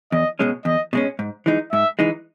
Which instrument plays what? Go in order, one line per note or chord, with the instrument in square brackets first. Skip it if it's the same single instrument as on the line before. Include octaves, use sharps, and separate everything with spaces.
[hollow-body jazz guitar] E2 [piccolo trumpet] D#5
[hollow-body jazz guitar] B2 G#3 C#4
[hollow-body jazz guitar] E2 [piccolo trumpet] D#5
[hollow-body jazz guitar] B2 G#3 C#4
G#2
E3 G#3 D#4
[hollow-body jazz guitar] G#2 [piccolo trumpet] E5
[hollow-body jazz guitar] E3 G#3 D#4